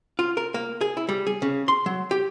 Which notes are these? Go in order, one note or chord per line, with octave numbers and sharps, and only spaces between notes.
F4
A#4
A#3
G#4
E4
G3
G#4
C#3
C6
F#3
G4